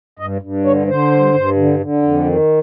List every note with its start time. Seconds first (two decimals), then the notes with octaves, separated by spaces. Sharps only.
0.19 G2 D#5
0.42 G2
0.65 D3 C#5
0.87 D3 C5
1.11 G2
1.34 G2
1.56 D3
1.80 D3
2.02 F2
2.25 D#3